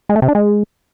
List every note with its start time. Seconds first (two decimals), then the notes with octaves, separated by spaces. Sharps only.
0.09 G#3
0.16 A3
0.22 C3
0.29 D4
0.35 G#3